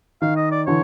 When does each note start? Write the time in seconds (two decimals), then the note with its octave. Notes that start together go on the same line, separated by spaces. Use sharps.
0.22 D#3 F5
0.37 D#5
0.51 D5
0.67 D3 E3 C#5